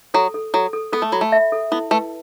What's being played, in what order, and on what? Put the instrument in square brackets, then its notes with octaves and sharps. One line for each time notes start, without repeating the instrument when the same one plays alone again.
[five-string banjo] F#3 [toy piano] A4
[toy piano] A4
[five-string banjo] F#3 [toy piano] A4
[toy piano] A4
[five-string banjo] B3 [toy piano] A4
[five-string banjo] A3
[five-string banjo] F#3 [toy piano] B5
[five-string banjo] A3
[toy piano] E5
A4
[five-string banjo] B3 [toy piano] E4
[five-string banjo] A3 [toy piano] B4